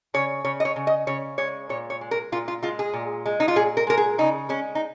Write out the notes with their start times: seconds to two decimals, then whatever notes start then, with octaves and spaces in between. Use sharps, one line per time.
0.14 C#3 C#5
0.44 C#3 C#5
0.60 D#5
0.65 C#5
0.76 C#3
0.87 D#5
1.07 C#3 C#5
1.38 G#3 C#5
1.69 A#2 C#5
1.90 C#5
2.01 G#3
2.11 A#4
2.32 A#2 F4
2.48 F4
2.63 G#3 F4
2.79 G#4
2.94 A#2
3.26 G#3
3.40 D#4
3.48 F4
3.56 A#2 G#4
3.77 A#4
3.87 G#3 A#4
3.97 G#4
4.18 C#3 D#4
4.49 G#3 C#4
4.75 D#4